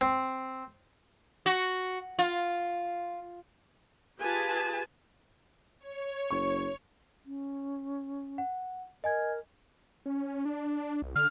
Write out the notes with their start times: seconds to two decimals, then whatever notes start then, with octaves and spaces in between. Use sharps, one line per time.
0.01 C4
1.46 F#4
2.19 F4
4.20 F4 G4 G#4 B4 G#5 A5
5.79 C#5
6.31 F#1 C#6
7.25 C#4
8.38 F#5
9.04 A#4 D#5 G#5 G#6
10.06 C#4
10.45 D4
11.02 C2
11.16 D3 F6